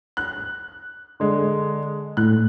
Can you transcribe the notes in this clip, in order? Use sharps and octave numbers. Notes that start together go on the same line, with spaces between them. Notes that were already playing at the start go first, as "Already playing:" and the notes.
F#6
D3 G#3
A2 F#6